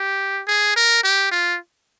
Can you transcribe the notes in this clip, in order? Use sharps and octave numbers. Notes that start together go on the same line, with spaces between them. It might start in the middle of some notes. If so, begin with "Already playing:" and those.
Already playing: G4
G#4
A#4
G4
F4